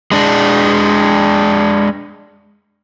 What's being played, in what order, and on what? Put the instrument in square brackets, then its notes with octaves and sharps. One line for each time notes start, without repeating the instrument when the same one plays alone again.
[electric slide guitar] G#3 D4